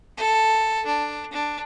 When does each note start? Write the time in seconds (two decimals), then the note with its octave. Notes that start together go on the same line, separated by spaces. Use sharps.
0.17 A4
0.85 D4
1.32 D4